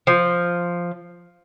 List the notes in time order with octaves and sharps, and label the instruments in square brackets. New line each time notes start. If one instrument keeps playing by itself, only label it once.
[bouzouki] F3